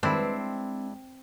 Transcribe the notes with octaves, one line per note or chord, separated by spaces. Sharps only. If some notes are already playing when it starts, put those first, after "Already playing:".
F2 D#3 G#3 C4 D4 E4 B4